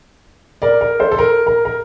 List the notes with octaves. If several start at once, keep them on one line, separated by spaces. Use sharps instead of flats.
A#4 D5
A#4
A4 C5
A4
A#4
A#4
A#4